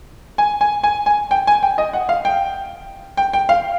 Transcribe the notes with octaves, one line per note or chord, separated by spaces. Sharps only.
G#5
G#5
G#5
G#5
G5
G#5
G5
D#5
F#5
F5
G5
G5
G5
F5